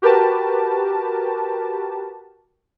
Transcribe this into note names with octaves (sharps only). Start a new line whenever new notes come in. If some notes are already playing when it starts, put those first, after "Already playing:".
F#4 G4 A#4 B4 A5